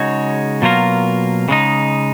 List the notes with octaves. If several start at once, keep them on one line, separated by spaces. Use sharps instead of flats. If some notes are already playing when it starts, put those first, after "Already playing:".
Already playing: C#3 G#3 D#4 F#4 C#5
B2 F#3 A#3 F4 A#4
C#3 G#3 D#4